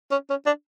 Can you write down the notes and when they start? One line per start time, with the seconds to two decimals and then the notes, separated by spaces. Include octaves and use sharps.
0.11 C#4
0.30 C#4
0.46 D4